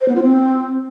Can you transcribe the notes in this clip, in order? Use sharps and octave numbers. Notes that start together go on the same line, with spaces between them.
C5
B3
F4
C4